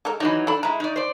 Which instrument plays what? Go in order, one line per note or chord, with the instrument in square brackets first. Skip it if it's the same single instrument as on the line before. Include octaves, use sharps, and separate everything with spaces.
[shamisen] G#3 A4 A#4
[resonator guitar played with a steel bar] E3 F#3 D#4 [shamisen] D4
[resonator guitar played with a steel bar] D4 [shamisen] A4 B5
[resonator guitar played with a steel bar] G#3 E4 [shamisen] A#5
[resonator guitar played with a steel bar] D#4 D5
C5 D5